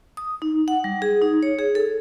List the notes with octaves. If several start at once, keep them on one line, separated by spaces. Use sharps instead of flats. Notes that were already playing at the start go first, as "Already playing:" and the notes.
D#6
D#4
F#5
G3
G#4
D#4
C#5
G#4
A4